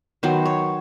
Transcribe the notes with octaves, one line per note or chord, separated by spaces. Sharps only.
D#3 F#3 B3 C5
C#5